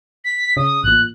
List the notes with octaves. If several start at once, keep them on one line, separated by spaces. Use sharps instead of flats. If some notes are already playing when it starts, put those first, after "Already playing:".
B6
C#3 D#6
A1 A#2 F#6